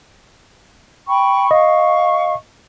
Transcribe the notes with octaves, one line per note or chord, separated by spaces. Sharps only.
G5 B5 C#6
D#5 F5 C#6